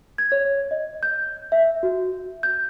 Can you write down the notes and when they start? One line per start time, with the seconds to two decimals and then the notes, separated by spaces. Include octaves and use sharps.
0.18 G#6
0.32 C#5
0.71 D#5
1.03 G6
1.52 E5
1.83 F#4
2.43 G6